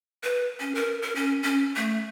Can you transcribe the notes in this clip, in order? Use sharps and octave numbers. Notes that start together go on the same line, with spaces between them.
B4
C#4
A#4
A#4
C#4
C#4
A3